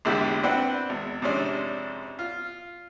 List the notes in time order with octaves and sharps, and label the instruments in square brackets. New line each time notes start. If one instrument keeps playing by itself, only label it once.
[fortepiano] A#1 E2 G#2 D3 E4 G4
C4 D4 E4 B4 F#5 G5
G#1 E2
F2 G#2 C3 C#4 D4
F4